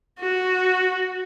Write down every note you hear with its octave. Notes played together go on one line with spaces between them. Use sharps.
F#4